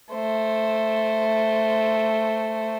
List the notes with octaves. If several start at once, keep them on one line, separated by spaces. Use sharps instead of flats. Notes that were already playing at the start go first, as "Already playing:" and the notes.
A3 C5